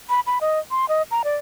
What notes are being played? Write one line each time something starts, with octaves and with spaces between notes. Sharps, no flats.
B5
B5
D#5
C6
D#5
A#5
D5